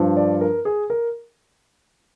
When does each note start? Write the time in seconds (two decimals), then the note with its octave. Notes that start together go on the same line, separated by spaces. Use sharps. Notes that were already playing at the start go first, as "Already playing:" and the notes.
Already playing: G2 F3
0.17 D5
0.41 A#4
0.65 G#4
0.90 A#4